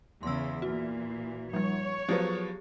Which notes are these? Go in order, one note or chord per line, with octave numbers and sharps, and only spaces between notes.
E2 C#3 C6 E6
A#2 E3 F#4
F3 G3 C#5
F3 F#3 B3 G4 G#4